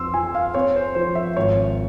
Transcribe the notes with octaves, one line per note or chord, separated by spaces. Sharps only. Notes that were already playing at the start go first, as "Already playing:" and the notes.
Already playing: F2 C6 E6
F3 G#5
F5
C4 C#5
C5
F3 C5
E5
G#1 C#5